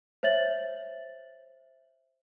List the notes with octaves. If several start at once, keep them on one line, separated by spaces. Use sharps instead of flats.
C5 C#5 E5 A6 F#7